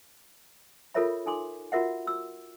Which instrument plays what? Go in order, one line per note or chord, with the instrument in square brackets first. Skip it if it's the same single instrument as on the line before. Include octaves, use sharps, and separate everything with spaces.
[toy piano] F4 A4 A#4 C#5 E5 B5
D#4 A4 G#5 C6 D6
F4 F#4 A#4 E5 F#5
F#4 E6